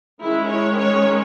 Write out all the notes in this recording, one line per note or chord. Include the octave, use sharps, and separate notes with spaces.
D#3 G#3 C#4 E4
C#5
C#5